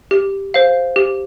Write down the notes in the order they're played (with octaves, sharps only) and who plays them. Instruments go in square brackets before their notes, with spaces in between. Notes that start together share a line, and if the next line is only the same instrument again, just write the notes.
[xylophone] G4
C5 F5
G4